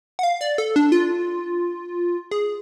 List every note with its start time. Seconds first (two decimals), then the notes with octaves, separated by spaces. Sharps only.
0.19 F#5
0.23 F5
0.41 D5
0.58 A4
0.76 D4
0.92 F4
2.31 G#4